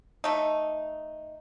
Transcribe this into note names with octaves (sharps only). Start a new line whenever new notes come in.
A3 D#4